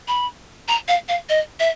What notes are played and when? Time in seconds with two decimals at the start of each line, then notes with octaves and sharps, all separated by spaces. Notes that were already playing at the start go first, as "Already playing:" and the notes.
0.08 B5
0.68 A#5
0.88 F5
1.09 F5
1.29 D#5
1.60 E5